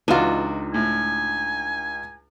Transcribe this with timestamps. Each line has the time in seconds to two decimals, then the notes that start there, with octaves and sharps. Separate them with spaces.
0.08 C#2 E3 D4 D#4 F4 F#4 D#7
0.74 A2 G#5